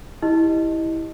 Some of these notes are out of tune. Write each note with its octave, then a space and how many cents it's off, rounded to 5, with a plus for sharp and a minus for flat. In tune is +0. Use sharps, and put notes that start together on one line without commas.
E4 -15 G4 +0 D#5 +0